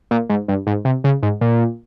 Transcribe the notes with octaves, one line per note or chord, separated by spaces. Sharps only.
A#2
G#2
G2
G#2
C3
C#3
G#2
A#2